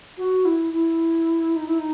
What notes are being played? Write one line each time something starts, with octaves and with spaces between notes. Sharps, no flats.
F#4
E4
E4
D#4
E4
D#4